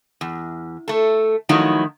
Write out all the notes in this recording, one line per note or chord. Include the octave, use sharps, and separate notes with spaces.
E2
A3 A4
D#3 F3 F#3 A3 D#4 E4